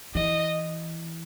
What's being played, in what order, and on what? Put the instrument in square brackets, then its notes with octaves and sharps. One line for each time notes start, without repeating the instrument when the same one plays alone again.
[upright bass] E3 [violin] D#5